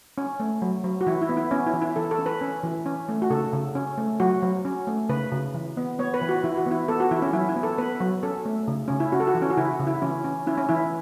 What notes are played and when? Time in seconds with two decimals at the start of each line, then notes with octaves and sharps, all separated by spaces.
0.18 C#4
0.40 A3
0.62 F#3
0.84 F#3
1.01 F#4
1.07 E3 E4
1.22 E4
1.29 B3
1.37 E4
1.51 B3 C#4
1.67 E4
1.74 E3
1.82 E4
1.96 E3 A4
2.11 A4
2.19 C#4
2.26 B4
2.41 C#4
2.63 E3
2.86 C#4
3.09 A3
3.22 F#4
3.30 C#3 A4
3.53 C#3
3.75 C#4
3.98 A3
4.20 F#3 F#4
4.42 F#3
4.65 C#4
4.87 A3
5.09 C#3 B4
5.32 C#3
5.54 E3
5.77 B3
5.99 B3 C#5
6.14 B4
6.22 E3
6.29 F#4
6.44 E3 E4
6.57 F#4
6.66 B3 E4
6.88 B3 A4
7.00 F#4
7.11 E3 E4
7.22 C#4
7.33 F#3 E4
7.49 E4
7.56 B3
7.63 A4
7.78 B3 B4
8.01 F#3
8.23 C#4 A4
8.45 A3
8.68 C#3
8.88 C#3 C#4
9.00 E4
9.12 C#4 F#4
9.20 A4
9.27 F#4
9.35 E3
9.42 C#4
9.50 F#4
9.57 C#3 E4
9.80 C#3
9.87 E4
10.02 E3 C#4
10.24 C#4
10.47 C#4 E4
10.58 C#4
10.69 E3 E4